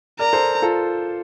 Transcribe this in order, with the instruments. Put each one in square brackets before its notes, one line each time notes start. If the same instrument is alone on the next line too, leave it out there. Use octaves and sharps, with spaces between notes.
[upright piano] A#4 D5 [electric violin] A#5
[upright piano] A4 C5
F4 A4